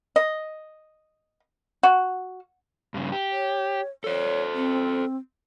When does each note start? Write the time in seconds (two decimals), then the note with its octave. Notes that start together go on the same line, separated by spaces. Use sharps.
0.16 D#5
1.83 F#4
2.94 G2 C#3
3.12 G4
3.31 C#5
4.04 A4 C5 C#5
4.54 C4